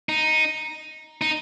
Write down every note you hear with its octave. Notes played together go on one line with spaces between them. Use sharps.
D#4
D#4